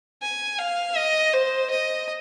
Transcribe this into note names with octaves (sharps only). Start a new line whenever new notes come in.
G#5
F5
D#5
C5
D#5